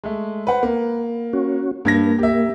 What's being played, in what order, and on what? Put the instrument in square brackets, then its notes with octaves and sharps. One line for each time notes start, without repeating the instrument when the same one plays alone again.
[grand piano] G#3 A3
B4 C5 F#5
A#3
[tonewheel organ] C#4 F#4
[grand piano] G2 G#6 A#6 [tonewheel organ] A#3
[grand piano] G4 E5